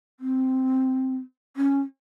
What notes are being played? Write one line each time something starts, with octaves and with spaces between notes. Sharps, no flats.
C4
C#4